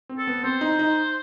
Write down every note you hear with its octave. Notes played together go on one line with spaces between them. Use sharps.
C4
A4
B3
C4 C5
D#4
D#4